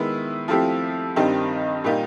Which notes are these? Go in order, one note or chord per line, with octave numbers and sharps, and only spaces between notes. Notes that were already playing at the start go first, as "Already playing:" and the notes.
Already playing: D#3 G#3 B3 E4
F3 A3 C4 E4 G4
G2 D#3 G3 C4 D#4
A#2 G3 A#3 D#4 G4